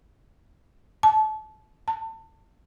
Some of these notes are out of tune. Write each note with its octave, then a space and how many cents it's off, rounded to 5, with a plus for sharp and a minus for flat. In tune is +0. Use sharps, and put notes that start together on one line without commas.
A5 -30
A5 +25